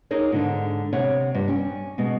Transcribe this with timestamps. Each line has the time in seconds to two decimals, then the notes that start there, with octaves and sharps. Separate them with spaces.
0.11 D#4 G#4 A#4 C#5
0.32 G#2 D3 D4
0.93 C3 C#5 F#5
1.35 G2
1.48 C#4 G5
1.98 B2 G#3